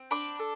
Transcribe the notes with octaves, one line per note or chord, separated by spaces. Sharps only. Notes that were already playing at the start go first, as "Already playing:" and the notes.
Already playing: C4
D4 B5 D6
A4